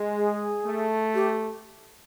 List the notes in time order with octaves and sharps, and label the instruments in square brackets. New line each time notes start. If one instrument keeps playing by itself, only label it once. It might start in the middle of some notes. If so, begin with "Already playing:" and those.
Already playing: [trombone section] G#3
[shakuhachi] G#4
[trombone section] A3
[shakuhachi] G4